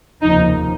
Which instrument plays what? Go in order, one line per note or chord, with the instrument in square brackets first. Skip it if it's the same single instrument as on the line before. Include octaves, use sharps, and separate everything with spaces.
[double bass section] F1 D#2 C#3 F3 A#3 [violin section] D#4